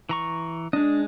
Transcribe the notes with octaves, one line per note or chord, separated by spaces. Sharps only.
E3 A#5 C#6
G#3 D4 D#5